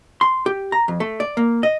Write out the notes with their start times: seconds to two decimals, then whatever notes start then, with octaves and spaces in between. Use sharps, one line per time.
0.21 C6
0.46 G4
0.72 A#5
0.88 F2
1.00 A3
1.20 D5
1.37 A#3
1.63 D#5